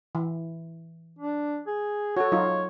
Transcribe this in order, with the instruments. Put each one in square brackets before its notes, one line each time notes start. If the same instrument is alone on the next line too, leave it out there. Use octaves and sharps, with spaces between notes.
[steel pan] E3
[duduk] D4
G#4
[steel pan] F#4 A4 [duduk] C#5
[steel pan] F#3 D#4 F4